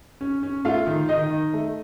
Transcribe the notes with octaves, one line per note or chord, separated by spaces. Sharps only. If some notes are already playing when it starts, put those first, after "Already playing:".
C#4
C#4
A3 F4 F5
D#3
D#3 D#4 D#5
D#3
A3